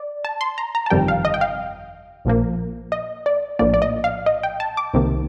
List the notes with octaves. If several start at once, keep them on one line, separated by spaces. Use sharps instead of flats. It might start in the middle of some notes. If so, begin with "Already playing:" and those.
Already playing: D5
A5
C6
A#5
A#5
A5
G1 F2 C3 D#3 G3 G5
F5
D#5
G5
F5
A#1 A#2 F3 A#3
D#5
D5
A#1 A2 F3 A#3 D5
D5
D#5
F5
D#5
G5
A5
D6
C2 C3 D#3 A#3